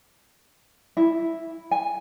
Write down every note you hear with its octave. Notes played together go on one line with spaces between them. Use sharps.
E4
G#5